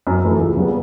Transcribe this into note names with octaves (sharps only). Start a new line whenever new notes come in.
F#2
E3 A3
C#2
C#3 G3 B3